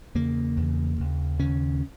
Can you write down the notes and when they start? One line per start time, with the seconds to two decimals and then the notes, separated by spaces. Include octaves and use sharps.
0.15 E2 C#3 A#3
0.57 E2 C#3
0.98 D#2 C#3
1.39 D#2 C#3 C#4